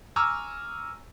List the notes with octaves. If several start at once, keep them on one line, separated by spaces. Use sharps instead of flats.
G#5 A#5 C#6 D6 E6 F6